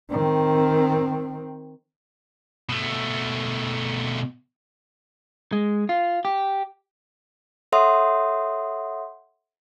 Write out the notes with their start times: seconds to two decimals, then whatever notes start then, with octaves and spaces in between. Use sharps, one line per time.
0.10 D#3 C4
2.69 B2 A3
5.52 G#3
5.89 F4
6.25 G4
7.72 A4 C#5 E5 F#5 C6 D#6